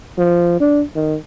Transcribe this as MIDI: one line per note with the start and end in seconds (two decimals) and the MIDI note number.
0.18 0.58 53
0.60 0.83 62
0.95 1.16 51